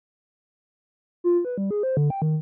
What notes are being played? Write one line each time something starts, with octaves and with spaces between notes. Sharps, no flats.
F4
B4
G3
G#4
C5
D3
G5
D#3